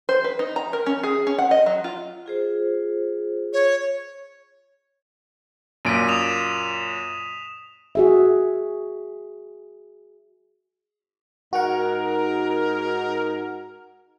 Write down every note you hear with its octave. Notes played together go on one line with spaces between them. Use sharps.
C5
B4
D#4
A#5
A#4
C#4
G#4
C#4
F#5
D#5
F#3
F4
F4 G#4 C5
C#5
F#2 A#2 B6 D7 D#7
D#6 E7 F7
F#4 G#4 E5
G#2 D#4 F#4 A#4 F#5